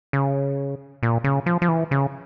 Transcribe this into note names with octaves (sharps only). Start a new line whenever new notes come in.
C#3
A#2
C#3
F3
F3
E3
C#3